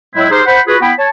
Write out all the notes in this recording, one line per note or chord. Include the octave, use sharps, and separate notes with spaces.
A2 F#3 G#3 C4 E4
D#4 G4 G#4 A#4 C5
C5 F#5 B5
F4 F#4 G#4 B4
B3 E4 G5 B5
C#5 A5